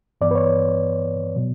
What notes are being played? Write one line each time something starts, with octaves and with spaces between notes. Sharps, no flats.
G2 E3 B3 D5
B4
C#5
B2 F#3 B3